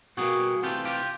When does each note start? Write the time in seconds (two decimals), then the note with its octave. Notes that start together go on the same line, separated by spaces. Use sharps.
0.17 B2 G3 A#3 F#4 G#4
0.62 C3 E3 A3 D4 F4 G4
0.85 F4 G4